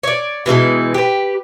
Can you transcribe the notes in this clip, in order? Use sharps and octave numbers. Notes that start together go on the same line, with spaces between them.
C#5 D5
B2 E3 G#3 D#4
G4 B4